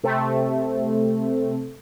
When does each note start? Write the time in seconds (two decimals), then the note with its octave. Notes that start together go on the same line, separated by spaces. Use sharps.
0.04 C3 A3 C4